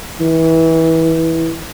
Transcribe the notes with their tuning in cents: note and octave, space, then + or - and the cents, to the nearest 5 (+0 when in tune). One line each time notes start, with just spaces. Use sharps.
E3 -20